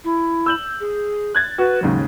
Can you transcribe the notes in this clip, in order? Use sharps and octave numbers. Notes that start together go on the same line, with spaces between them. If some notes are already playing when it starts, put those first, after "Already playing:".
E4
E6 G6 F#7
G#4
F#6 G#6 A6
F#4 B4
D#2 G#2 C#3 F#3